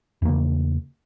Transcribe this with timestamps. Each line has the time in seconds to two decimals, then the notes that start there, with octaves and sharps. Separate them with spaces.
0.22 E2
0.25 A#3
0.29 C#3